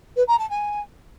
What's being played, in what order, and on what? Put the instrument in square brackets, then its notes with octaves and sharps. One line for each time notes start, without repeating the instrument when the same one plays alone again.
[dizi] B4
A#5
A5
G#5